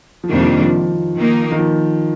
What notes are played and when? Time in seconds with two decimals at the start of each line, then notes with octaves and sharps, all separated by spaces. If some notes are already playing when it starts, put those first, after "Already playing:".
0.24 F3
0.29 F2 C3 D#3 G3 A#3 D4
0.40 F3
0.51 D#3
0.62 F3
1.17 D#3 A#3 D#4
1.52 D#3
1.59 F3